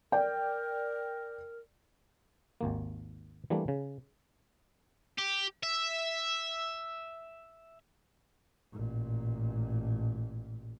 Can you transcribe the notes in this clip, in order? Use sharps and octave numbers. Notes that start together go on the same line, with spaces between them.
A#4 D5 G5
G#1 D#2 A#3
E3 G3 A3 A#3 D4
C#3
G4
E5
A1 A#2